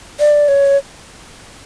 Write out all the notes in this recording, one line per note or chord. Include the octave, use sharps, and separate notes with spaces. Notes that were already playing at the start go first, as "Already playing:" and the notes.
D5
C#5